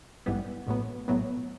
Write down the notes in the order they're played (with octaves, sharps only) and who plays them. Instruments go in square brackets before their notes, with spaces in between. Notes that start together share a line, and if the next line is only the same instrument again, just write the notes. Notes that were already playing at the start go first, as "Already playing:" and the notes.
[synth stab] A1 G#2 E3 G3 B3
A#1 A2 F#3 B3
A#1 A2 F#3 B3